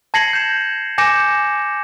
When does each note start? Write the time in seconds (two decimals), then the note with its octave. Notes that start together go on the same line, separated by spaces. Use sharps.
0.14 A5 G#6 A#6 C7 C#7 F#7
0.33 G6 E7
0.98 G#5 D6 G6 A#6 C#7 E7